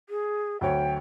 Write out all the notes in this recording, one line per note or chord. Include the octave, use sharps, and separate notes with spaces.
G#4
D2 F#3 C#5 G5